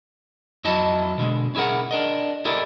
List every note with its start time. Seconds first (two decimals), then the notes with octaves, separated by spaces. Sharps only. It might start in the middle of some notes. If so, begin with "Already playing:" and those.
0.64 F2 F#3 E4 D#5 A5
1.18 B2 D3 F3 G#3
1.55 C#4 E4 G#4 A#4 F#5
1.91 D4 A#4 D#5
2.45 E4 G4 A4 A#4 D5 D#5